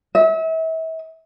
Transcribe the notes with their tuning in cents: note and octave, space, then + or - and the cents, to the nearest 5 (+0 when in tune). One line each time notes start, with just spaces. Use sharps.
E5 -35